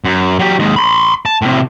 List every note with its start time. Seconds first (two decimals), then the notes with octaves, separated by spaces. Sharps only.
0.04 F#2
0.39 F#3 G4
0.59 D#2 G#3
0.76 B5 C6
1.26 A5
1.42 A2 C3